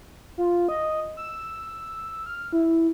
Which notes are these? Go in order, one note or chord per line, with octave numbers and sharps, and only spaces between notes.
F4
D#5
E6
F6
E4